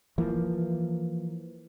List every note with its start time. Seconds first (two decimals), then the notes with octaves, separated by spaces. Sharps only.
0.18 E3 F3 A#3